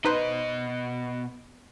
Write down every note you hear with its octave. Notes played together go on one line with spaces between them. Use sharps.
B2 D#4 B4 C5 D#5